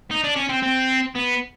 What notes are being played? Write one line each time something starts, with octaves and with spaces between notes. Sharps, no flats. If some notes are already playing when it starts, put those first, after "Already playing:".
D#4
D4
C#4
C4
C4
B3